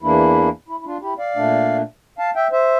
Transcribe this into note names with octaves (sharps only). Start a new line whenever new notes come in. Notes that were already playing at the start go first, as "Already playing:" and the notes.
E2 E3 A#3 D4 E4
E4
E4
D4 F4
E4 G4
D5 F5
A#2 A3 D4
F5 A5
E5 G5
C5 E5